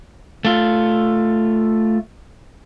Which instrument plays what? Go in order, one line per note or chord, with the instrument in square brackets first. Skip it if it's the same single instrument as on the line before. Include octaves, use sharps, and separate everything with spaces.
[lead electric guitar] A3 F4